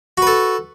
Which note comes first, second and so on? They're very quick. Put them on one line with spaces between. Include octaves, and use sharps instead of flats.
F#4 B4 A4